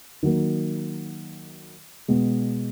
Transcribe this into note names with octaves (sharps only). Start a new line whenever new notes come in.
D#3 F#3 A#3
B2 G#3 B3